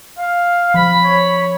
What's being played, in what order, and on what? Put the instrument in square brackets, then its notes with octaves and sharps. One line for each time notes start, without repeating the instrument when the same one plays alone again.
[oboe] F5
[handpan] F3 [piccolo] B5
[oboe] C#5